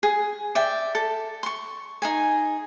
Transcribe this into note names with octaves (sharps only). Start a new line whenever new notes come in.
G#4
D5 E5 G5
A4
C6 C#6
D#4 G#4 G#5